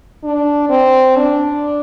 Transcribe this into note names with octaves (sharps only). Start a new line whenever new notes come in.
D4
C4
D4